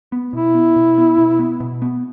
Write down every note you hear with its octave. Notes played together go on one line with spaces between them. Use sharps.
B3
B2 E4
B3
B2
B3
B2
B3
B2
B3